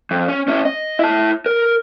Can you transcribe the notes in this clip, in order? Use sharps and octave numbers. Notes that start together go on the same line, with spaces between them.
F2
C#4
C#4 E4
D#5
E4 A5
A#4